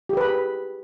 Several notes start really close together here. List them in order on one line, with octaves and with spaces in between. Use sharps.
G4 G#4 B4 B5